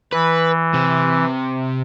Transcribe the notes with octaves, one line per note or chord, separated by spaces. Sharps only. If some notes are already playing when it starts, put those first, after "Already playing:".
E3 B4
C3